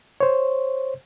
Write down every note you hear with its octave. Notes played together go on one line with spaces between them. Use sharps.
C5 C#5